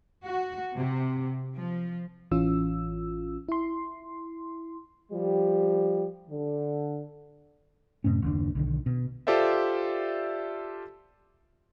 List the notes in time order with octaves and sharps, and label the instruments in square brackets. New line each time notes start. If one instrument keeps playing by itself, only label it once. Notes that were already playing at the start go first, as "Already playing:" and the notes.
[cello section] F#4
C3
F3
[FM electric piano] A1 E3 C#4 F4 E6
E4 C6
[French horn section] F3 G3 G4
D3
[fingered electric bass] F#2 A2 C3 C#4
F#1 D#2 D#3 D4
B1 D3 D#3
B2
[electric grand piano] F4 G4 A4 C5 D5 E5